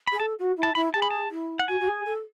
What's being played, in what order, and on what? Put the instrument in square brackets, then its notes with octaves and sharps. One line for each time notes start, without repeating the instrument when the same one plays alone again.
[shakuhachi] G#4 [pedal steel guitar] B5
[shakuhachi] A4 [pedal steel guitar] A5
[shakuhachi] F#4
E4
[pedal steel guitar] A5
[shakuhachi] E4 [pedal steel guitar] B5
[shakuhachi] G#4 [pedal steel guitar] A5
[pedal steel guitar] B5
A5
[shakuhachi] E4
[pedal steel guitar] F#5
[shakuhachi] F#4 [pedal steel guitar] G#5
[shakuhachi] F#4
G#4
A4